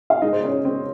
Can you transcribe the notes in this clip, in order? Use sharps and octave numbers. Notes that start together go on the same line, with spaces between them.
F5
G#3 D#4 D#5
C5
C#4 C#5
G#3
C4 C5